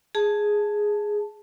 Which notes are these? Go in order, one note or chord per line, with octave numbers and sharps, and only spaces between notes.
G#4 A5